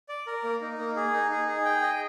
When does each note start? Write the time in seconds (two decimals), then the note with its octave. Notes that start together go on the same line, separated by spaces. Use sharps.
0.09 D5
0.27 A#4
0.43 A#3
0.61 D#4
0.78 A#3
0.96 G#4
1.13 D#4
1.31 G#4
1.48 G#4
1.65 G5
1.82 D#5